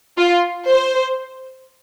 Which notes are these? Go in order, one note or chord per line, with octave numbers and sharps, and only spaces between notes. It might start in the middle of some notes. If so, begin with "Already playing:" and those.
F4
C5